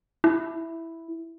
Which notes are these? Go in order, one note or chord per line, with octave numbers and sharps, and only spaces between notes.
E4